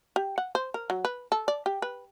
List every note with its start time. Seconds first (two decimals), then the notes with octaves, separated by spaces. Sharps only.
0.16 G4
0.38 F#5
0.55 C5
0.74 A#4
0.90 F#3
1.05 B4
1.32 A4
1.48 D5
1.66 G4
1.82 B4